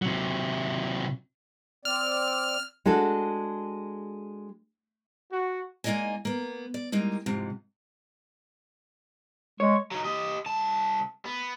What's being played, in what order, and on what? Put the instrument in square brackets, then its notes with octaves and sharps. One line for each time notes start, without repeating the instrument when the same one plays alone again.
[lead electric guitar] C3 F#3
[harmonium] C4 D5 [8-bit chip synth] F6
[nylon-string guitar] G#3 D4 F#4 A4
[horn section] F#4
[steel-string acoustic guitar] G#3 A#3 D#4 D5 D#5 G#5
A#3 B3
D5
G3 G#3 A#3 D#4
F2 G#2 C3
[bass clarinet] G#3 [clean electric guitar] C#5
[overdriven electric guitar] F#3 D#4
G4 D#5
C2 A5
B3